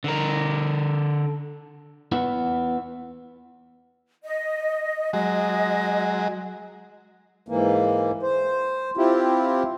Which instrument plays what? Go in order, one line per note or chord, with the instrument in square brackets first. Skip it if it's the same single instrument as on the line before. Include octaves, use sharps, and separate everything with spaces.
[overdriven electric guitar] D3 A#4
[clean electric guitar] B3 E4 F#5
[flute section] D#5
[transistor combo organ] F#3 G#3 [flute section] D#5
[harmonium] G#2 E3 A#3
C5
C4 E4 F4 G4